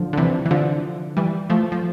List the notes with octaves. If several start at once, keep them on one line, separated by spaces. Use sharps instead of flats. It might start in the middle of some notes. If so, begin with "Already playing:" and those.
Already playing: D3 F3
D3
C3 E3
E3
D3 F3
E3 G3
F3 A3
F3